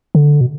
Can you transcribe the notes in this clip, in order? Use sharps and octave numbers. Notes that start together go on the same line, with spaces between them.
D3
B2